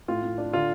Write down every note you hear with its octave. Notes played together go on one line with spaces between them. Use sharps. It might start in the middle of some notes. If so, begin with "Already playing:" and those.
A2 F4
A2
D4
D3 F4